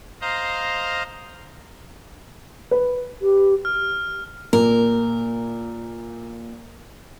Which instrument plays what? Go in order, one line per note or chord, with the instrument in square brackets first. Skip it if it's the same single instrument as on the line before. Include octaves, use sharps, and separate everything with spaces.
[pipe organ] C5 D#5 F5 A#5
[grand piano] B4
[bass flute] G4
[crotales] F6
[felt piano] A#2 [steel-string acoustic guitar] A#4